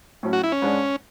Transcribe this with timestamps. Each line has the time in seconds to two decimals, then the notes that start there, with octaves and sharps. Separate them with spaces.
0.23 A2 F#3 C#4
0.33 F#4
0.44 E4
0.52 C#4
0.62 G#2 G#3 D4